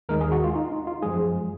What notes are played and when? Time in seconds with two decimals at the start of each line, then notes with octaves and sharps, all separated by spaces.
0.09 D#2 D#3 G#3 A#4
0.21 G#4
0.32 F#4
0.44 F4
0.56 D#4
0.72 D#4
0.87 F4
1.02 F#2 F3 G#3 G#4